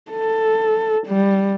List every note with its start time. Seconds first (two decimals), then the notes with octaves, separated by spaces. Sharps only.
0.12 A4
1.07 G3